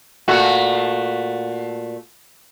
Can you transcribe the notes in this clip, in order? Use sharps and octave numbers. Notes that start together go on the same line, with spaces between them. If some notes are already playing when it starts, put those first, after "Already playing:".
A#2 A3 F#4